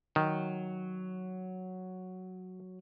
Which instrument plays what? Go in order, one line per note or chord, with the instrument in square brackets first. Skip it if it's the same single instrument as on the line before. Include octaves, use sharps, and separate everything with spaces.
[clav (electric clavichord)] D#3 [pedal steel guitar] F#3